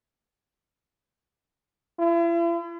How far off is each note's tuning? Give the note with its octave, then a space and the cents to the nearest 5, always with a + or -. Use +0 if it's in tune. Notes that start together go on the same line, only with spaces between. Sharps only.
E4 +45